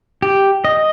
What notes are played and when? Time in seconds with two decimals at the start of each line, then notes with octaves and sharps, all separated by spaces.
0.22 G4
0.65 D#5